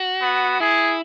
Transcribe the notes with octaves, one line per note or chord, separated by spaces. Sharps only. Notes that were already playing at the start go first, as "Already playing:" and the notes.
Already playing: F#4
B3
E4 G#4